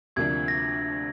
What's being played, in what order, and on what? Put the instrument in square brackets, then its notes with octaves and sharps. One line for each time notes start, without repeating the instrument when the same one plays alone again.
[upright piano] D2 C3 F3 A#3 D4 [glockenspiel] G#6
[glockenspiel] A#6